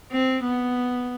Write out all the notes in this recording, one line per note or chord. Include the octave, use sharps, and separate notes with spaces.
C4
B3